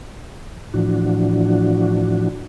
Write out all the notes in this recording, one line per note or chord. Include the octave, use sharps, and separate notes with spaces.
A2 E3 F3 D4 F#4